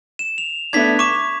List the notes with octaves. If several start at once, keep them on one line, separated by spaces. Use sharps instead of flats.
E7
F7
A3 B3 D4 G#6 B6
C#6 D6 E7